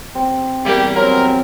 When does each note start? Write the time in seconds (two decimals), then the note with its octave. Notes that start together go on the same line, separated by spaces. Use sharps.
0.15 C4
0.65 E2 G3 A#3 G4
0.95 F#3 C4 A#4 G#5 C6